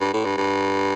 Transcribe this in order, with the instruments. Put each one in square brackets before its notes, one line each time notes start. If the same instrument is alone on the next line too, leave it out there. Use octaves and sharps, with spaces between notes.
[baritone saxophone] G2
A2
G2
G2